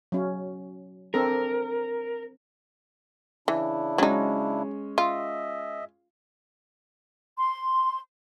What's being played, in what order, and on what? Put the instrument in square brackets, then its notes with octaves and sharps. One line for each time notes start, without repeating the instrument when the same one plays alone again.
[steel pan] F#3 C#4
[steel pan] C4 D4 A4 [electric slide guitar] A#4
[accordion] C#3 D4 E4 [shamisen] E3
[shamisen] F#3 D#4 [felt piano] G#3 C#4
[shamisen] F4 [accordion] D#5 E5
[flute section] C6